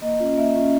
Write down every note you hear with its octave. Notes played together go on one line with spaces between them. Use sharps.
A#3 D#5
C#4 F4
A#3 E5
C#4 F4